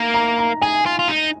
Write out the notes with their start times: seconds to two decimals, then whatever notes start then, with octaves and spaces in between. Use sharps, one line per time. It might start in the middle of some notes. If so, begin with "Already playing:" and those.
Already playing: A#3 A#5
0.14 A#5
0.38 A#5
0.62 G#4 G#5
0.86 F4
0.99 F4
1.08 D#4